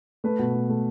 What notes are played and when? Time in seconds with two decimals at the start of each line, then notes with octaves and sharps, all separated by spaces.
0.24 A3 B4
0.39 B2
0.54 A3
0.69 A3